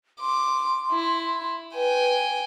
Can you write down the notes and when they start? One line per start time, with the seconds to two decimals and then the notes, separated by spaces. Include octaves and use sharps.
0.21 C6 D6
0.92 E4
1.75 B4 G5 G#5